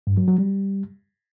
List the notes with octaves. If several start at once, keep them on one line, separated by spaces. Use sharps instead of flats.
G2
F#3
F#3
G3